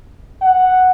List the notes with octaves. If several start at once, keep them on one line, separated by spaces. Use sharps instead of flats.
F#5